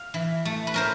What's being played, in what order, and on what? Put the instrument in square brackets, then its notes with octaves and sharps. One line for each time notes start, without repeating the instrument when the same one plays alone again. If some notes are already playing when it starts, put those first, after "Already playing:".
Already playing: [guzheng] F5
E3
A3
B4
C#4 A#4 C5